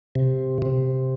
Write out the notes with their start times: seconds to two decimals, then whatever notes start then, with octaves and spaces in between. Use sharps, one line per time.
0.15 C3
0.62 C3